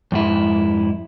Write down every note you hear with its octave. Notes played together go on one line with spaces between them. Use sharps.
F2 G#2 E4